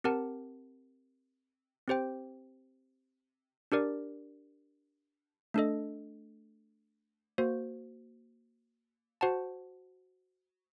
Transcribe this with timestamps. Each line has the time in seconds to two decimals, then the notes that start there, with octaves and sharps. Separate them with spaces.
0.04 C4 G4 A#4 F#5 A5
1.88 C4 G4 C5 G5
3.72 D4 G4 A#4 D5
5.54 A3 D4 A4 D#5
7.38 A#3 F#4 C5
9.21 F#4 C5 F#5 A5